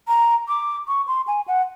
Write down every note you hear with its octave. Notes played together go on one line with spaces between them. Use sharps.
A#5
D6
C#6
C6
G#5
F#5